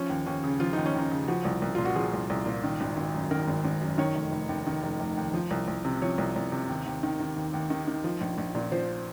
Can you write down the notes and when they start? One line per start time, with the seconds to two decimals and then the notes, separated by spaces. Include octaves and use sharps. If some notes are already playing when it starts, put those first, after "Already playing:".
Already playing: F3 C#4
0.10 D#2
0.26 D#2 C#4
0.44 C#3
0.60 F3 F4
0.73 D#2 D#4
0.86 C#4
0.95 D#2 D#4
1.11 C#3
1.28 F3 F#4
1.45 C2
1.62 C2
1.75 A#2 F4
1.85 F#4
1.96 F3 G#4
2.13 C2
2.30 C2
2.46 A#2
2.64 D#3
2.81 G#1
2.97 G#1
3.14 F#2
3.31 D#3 A#4
3.48 G#1
3.65 G#1
3.82 F#2
3.98 D#3 C#5
4.15 F1
4.32 F1
4.49 D#2
4.67 D#3
4.83 F1
5.00 F1
5.17 D#2
5.34 F3
5.51 C2
5.68 C2
5.85 C3
6.02 F3 C#5
6.18 C2
6.36 C2
6.52 C3
6.69 D#2
6.86 D#2
7.03 D#3
7.20 D#3
7.36 D#2
7.54 D#2
7.70 D#3
7.87 D#3
8.04 F3
8.21 A#1
8.38 A#1
8.55 A#2
8.72 F3 C5